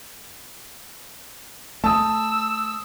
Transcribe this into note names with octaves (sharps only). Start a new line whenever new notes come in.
A3 A5 D#6 E6